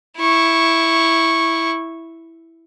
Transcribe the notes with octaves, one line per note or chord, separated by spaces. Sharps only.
E4 C#6